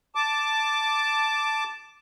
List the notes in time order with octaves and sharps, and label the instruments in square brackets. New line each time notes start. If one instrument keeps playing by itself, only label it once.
[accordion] A5 D6